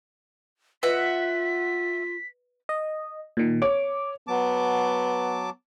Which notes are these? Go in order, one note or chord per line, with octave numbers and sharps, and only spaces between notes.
F4 B4 D#5 E5 F#5 B6
D#5
A#2 D#3
C#5 D6
F#3 B3 A5 D6